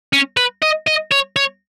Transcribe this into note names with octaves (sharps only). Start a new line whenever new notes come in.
C#4
B4
D#5
D#5
C#5
C#5